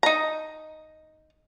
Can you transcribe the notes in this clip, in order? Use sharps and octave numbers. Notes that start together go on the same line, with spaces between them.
D#4 A#5